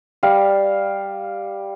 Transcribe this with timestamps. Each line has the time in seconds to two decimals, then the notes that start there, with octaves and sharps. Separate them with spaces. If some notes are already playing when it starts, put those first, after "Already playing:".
0.23 G3 F5